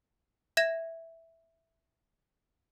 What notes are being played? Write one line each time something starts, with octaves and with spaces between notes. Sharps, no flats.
E5 G#6 A#6 E7